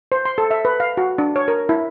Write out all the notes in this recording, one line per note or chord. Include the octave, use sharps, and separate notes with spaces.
C5
C6
A4
E5
B4
F5
F#4
D4
C#5
A#4
E4